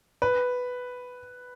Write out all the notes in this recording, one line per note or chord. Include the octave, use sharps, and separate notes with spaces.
B4